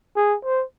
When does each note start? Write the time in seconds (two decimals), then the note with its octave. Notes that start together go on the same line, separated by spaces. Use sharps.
0.16 G#4
0.44 C5